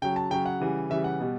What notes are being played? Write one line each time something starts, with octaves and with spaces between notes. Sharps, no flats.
C#3 F#3 G5
A5
C#3 F#3 G5
F#5
C#3 E3 G3
C#3 E3 G3 E5
F#5
B2 G3